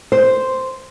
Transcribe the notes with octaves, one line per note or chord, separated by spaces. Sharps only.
C5